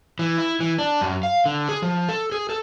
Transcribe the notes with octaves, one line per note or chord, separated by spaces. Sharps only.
E3
E4
E3
D4
F#2
F5
D3
G#4
F3
A4
G#4
A4